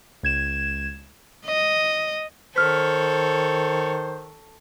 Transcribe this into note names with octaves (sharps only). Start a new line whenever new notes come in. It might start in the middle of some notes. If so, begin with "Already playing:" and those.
C#2 G#6 E7
D#5
D#3 A4 C5 C#5 F6 B6